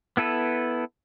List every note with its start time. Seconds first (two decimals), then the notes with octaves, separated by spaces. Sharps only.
0.17 B3 E4 A4 B4